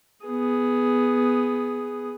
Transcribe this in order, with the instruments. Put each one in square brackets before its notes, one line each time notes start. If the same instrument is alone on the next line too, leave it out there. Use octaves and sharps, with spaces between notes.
[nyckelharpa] B3 G#4